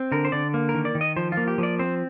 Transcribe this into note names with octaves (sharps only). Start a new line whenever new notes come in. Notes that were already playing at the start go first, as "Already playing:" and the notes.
Already playing: C4
D3 A#4
C5
D3 D5
A#3
A#4
D#3
D5
D#3
D#5
F3 C5
F4
A#3
G4
F3 D5
C4 C5